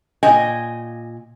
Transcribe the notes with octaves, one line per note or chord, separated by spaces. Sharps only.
A#2 D#5 G5 G#5